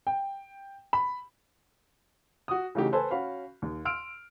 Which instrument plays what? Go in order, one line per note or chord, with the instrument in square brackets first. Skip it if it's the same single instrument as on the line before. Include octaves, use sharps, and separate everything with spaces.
[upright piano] G5
B5
F#4 D#6
C#3 E3 A3 D#4 F#4 G4
A4 B4 C5 G#5 A5
C#4 F#4 F5 B5
D#2
C6 E6 F6 D7